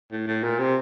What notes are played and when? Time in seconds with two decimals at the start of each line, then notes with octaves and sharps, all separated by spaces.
0.12 A2
0.27 A2
0.44 A#2
0.59 C3